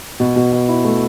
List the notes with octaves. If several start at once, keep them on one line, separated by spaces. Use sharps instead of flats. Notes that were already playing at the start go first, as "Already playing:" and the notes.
B2
B2
B2
E4
A3